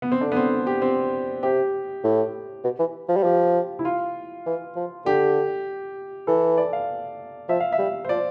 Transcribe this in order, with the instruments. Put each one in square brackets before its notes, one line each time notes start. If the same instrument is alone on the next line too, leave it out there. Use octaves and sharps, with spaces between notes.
[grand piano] B3
C4
[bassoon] D3 [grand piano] D4
[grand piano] B3
C4
G4
C4
[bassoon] C3 [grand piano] G4
[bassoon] A2
B2
E3
F3
G3
[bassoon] F3 [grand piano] G4
[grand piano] E4
F4
[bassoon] E3
F3
[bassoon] D3 [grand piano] G4
[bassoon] E3 [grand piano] A4
[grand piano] D5
F5
[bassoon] F3 [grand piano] E5
[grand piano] F5
E5
[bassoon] G3
[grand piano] C5
[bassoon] F3 [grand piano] D5